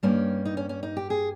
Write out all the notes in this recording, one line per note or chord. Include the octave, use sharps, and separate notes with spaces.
G2 G3 A#3 C#4
D#4
C#4
C#4
D#4
G4
G#4